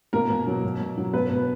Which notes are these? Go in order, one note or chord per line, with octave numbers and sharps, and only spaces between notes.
B2 A#3 A#4
B2
F#3
B2
B2
F#3
B2 B3 B4
B2